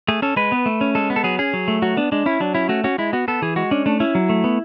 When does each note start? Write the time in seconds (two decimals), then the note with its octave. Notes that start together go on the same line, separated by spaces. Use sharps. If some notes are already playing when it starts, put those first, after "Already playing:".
0.08 A3 G#4
0.22 C#4 A4
0.36 G#3 B4
0.52 B3
0.66 A3
0.81 C#4
0.95 G#3 A4
1.10 B3
1.16 A4
1.24 F#3 G#4
1.39 C#4 G#4
1.53 F#3
1.68 A3
1.82 F#3 F#4
1.97 B3 D4
2.12 G#3 D4
2.26 C#4 E4
2.40 F#3 D4
2.55 C#4 E4
2.69 A3 F#4
2.84 C#4 F#4
2.98 G#3 E4
3.13 B3 F#4
3.28 B3 A4
3.42 E3 G#4
3.56 G#3 F#4
3.71 C#4 D4
3.86 A3 D4
4.00 C#4 E4
4.15 F#3
4.29 A3
4.44 B3